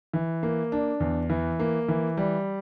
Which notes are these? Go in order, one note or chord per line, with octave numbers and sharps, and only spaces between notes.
E3
A#3
D4
E2
E3
A#3
E3
G3